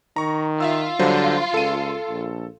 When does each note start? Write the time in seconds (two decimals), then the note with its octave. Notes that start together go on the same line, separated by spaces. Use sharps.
0.16 D#3 A#5 C#6
0.60 F4 E5 F5 E6
0.99 D3 F#3 G3 C5
1.54 C#2 A4 D#7
2.08 A#1